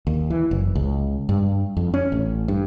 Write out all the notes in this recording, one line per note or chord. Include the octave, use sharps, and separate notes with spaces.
D#2
E3
F#1
C#2
G2
F2
C#4
A1
G2